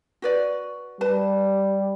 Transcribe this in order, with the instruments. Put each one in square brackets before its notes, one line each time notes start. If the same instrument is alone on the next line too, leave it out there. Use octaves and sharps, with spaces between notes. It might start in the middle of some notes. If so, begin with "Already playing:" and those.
[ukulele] F#4 B4 D5
[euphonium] G3 [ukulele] B4 A5